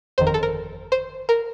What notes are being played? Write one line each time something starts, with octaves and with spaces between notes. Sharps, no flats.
G1 F2 D#3 C5
A#4
A4
A#4
C5
A#4